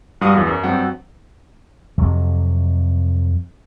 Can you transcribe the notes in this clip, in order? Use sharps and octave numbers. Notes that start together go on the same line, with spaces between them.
G2 G3 F#4 F5 F#5 D#6
E2 E3 F#3
F#2
G2 F#3 C4 F#5 G5
F2 C3 F#3